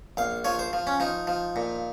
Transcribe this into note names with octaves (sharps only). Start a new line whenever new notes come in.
A#1 F5
F3 C#5
C5
F3
C#4
F3 D#4
F3
A#2